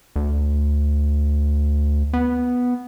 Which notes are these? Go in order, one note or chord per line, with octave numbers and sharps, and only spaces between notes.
D2
B3